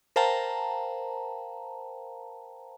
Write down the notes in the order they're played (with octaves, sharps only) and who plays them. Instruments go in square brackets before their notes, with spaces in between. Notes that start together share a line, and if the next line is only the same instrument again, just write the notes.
[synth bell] A#4 C5 F5 G5 A5 A#5